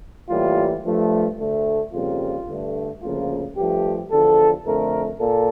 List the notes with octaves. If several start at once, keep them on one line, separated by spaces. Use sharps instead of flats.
A2 E3 G3 A#3 F4
G2 F3 A3
D2 D3 A3
F2 C#3 G3 A#3 F4
G2 D3 A3
D2 C#3 F3 A#3 F4
G2 F3 A3 G4
E2 D3 F3 A4
F2 D3 A3 A#4
A#2 A4